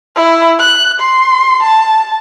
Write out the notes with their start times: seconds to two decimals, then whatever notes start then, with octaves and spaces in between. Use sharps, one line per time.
0.16 E4
0.60 F#6
1.00 C6
1.63 A5